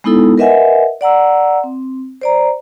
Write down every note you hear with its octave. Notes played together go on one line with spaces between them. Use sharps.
G#3 B3 D#4 E4 A4
A#4 B4 D#5 E5 F#5 G#5
D5 F#5 A#5 E6
C4
C5 D5 A#5